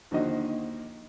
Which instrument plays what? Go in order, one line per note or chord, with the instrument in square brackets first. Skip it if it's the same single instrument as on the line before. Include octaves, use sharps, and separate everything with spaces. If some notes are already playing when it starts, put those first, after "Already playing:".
[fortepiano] D#2 D3 F3 D#4 F#4 D#5